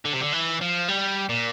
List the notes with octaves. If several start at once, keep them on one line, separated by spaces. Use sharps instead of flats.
D3
C3
D3
E3
F3
G3
A#2